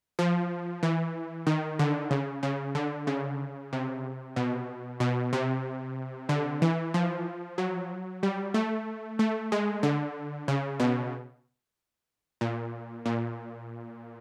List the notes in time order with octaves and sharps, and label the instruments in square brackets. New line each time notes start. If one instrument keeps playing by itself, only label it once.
[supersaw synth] F3
E3
D#3
D3
C#3
C#3
D3
C#3
C3
B2
B2
C3
D3
E3
F3
F#3
G3
A3
A3
G#3
D3
C#3
B2
A#2
A#2